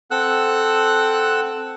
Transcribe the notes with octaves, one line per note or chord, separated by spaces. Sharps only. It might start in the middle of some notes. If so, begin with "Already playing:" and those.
C4 A4 F#5 E6 F#6